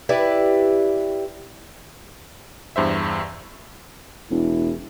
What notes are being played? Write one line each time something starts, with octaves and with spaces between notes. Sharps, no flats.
E4 G4 B4 D5
E2 G2 C5 E5
E1 E4